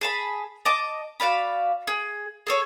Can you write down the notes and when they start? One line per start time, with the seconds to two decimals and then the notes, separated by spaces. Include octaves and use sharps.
0.01 G#4 A5 B5
0.65 D#5 A5 D6
1.20 F#4 D5 F5 B5
1.87 G#4
2.47 G#4 A4 C#5